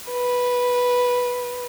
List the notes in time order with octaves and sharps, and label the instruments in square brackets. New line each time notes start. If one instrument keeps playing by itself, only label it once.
[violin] B4